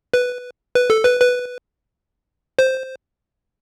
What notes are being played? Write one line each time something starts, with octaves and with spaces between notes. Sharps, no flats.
B4
B4
A4
B4
B4
C5